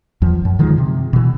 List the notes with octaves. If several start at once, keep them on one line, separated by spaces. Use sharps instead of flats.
E2 F3
F#2
D3 D#3 F3 G#3
C3
B2 E3